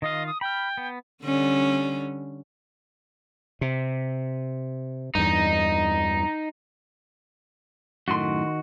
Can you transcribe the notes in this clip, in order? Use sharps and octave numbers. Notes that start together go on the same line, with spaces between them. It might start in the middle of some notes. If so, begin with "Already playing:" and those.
D#3 F4 D#5 F5
D#6
G5 B5 F6
B3
D3 G3 C#4
C3
E2 G2 D#4
F#2 A2 D#3 F#4 C6